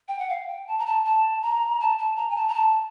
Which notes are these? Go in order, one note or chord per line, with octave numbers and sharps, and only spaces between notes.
G5
F#5
F5
G5
A5
A#5
A5
A5
A#5
A5
A5
A#5
G#5
A5
A#5
A5